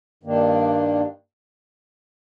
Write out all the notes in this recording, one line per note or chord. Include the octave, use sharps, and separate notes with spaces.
G2 D#3 A#3 D4